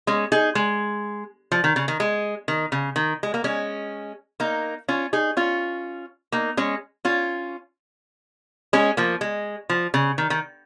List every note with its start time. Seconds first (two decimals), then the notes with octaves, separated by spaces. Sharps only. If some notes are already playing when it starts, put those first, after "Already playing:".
0.07 G#3 C#4
0.32 D#4 G#4
0.55 G#3
1.52 F3
1.64 D#3
1.76 C#3
1.88 D#3
2.00 G#3
2.48 D#3
2.72 C#3
2.96 D#3
3.23 G#3
3.34 A#3
3.44 G#3 C#4
4.40 A#3 D#4
4.88 C#4 F4
5.13 D#4 G#4
5.37 C#4 F4
6.32 A#3 D#4
6.57 G#3 C#4
7.05 C#4 F4
8.73 G#3 C#4
8.97 F3 A#3
9.21 G#3
9.70 F3
9.94 C#3
10.18 D#3
10.30 D#3